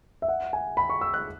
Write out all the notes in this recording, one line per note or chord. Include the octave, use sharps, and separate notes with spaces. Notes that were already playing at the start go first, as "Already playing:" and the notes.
E5
F#5
G#5
B5
C#6
E6
F#6